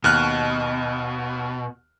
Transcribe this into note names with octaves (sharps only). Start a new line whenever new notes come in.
D#2 B2 F6 F#6